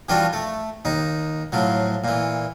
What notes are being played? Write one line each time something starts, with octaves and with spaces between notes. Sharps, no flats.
E3 F3 G3 D4 F4 F#4
A3
D#2 D#4
A2 F3 F#3
A#2 E3